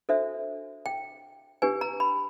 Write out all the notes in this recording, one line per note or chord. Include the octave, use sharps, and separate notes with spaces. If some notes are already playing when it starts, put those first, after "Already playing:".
D4 F#4 A4 C5 E5
G5
D4 G4 B4 G#5
A#5
B5